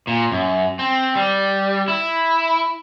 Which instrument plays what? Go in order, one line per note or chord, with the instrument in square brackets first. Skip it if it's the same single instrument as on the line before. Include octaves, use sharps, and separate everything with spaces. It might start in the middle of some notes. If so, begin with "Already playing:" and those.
[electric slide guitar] A#2
F#2
C4
G3
E4